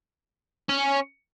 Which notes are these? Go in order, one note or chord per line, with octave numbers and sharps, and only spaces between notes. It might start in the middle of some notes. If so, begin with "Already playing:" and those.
C#4